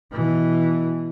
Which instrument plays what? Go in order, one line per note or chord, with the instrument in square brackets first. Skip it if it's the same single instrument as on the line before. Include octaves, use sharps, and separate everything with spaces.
[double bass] B2 E3